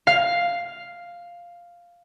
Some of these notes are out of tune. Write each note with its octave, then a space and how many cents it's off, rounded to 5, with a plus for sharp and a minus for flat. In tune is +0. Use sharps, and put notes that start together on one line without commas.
F5 +0